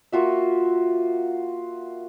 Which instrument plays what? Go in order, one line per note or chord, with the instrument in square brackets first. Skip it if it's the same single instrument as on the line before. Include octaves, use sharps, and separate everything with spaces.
[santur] A#3 F4 F#4 E5